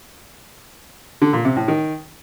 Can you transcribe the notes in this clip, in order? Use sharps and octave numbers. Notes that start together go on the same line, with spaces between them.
D3
A#2
C3
A2
D#3